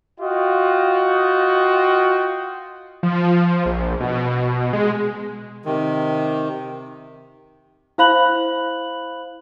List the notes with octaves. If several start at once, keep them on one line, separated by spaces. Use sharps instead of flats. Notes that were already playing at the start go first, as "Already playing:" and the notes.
F4 F#4 D#5 G5
F3
A#1
B2
G#3
C3 D#3
E4 C5 F5 B5 F#6 F#7